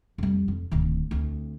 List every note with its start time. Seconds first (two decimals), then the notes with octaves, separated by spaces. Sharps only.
0.18 F2 G3
0.48 F2
0.72 D1 D#3
1.11 D2 C4